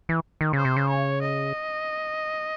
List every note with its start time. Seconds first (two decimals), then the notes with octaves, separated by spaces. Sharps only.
0.09 E3
0.41 D#3
0.53 C#3 C5
0.65 C3
0.76 C#3
0.89 C#5
1.22 D#5